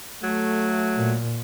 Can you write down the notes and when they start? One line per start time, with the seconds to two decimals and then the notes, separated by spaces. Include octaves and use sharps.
0.23 F#3 A3
0.96 A#2